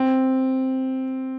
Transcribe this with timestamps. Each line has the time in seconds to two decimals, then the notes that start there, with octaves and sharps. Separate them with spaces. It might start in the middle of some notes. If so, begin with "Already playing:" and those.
Already playing: C4